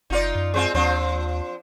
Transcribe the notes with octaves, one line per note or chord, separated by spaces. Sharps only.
F#1 D#4 F4 D5
F#2
G#3 C4 F4
D#2 F3 C4 D4